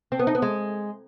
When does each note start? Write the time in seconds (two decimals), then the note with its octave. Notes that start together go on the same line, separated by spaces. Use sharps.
0.12 C4
0.19 B3
0.27 D#4
0.35 B3
0.42 G#3